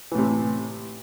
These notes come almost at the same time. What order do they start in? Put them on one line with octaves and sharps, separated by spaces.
E3 A2 C3